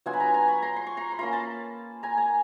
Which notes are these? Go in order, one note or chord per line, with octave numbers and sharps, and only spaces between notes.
F#3 B3 D4 F4 F#5 G#5
B5
G#5 A#5
G#5 A#5
B5 C#6
A#5 C6
C6
C#6
A#5 C6
B5
A#3 C#4 F4 A#5 C6
A5 B5
G#5 A#5
G#5 A#5